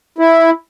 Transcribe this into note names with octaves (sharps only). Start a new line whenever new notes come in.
E4